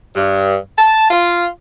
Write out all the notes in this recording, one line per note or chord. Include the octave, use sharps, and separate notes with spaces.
G2
A5
F4